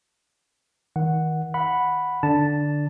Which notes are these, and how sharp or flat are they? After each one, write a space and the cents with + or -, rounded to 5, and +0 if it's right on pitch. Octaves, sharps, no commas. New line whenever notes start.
D#3 +35 F#5 +0
F#5 -5 B5 +0
D3 +0 D4 +0 A5 +0